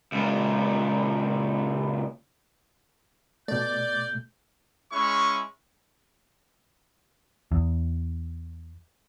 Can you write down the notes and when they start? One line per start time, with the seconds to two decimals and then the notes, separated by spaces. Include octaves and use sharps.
0.12 C#2 A#2
3.48 B2 A3 D5 G6
4.92 G#3 C#4 E4 C#6
7.52 E2